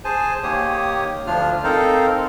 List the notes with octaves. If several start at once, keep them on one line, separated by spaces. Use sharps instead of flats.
G#4 C5 G#5 A5
D#3 A#3 G4 C#5 D#6
D2 F3 D4 F4 F6
C4 D#4 A4 A#4 C5 F5